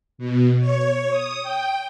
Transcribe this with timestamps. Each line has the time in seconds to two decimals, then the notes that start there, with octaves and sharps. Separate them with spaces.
0.18 B2
0.60 C#5
1.10 D#6
1.42 G5